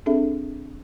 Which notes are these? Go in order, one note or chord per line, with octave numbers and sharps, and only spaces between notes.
C4 D4 G#4 A4 E5